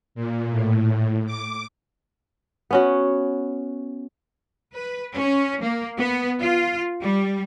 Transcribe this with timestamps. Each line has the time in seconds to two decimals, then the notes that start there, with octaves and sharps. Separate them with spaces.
0.15 A#2
0.50 A2
1.26 D6
2.71 B3 C#4 F#4
4.75 B4
5.16 C#4
5.63 A#3
5.99 B3
6.42 F4
7.01 G3